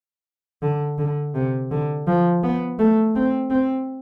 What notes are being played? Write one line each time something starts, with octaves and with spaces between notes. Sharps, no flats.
D3
D3
C3
D3
F3
B3
A3
C4
C4